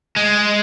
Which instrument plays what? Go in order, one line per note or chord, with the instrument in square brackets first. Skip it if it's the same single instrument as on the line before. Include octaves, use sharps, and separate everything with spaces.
[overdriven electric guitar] G#3